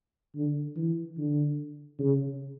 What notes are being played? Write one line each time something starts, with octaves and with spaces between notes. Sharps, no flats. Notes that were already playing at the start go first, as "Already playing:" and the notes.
D3
E3
D3
C#3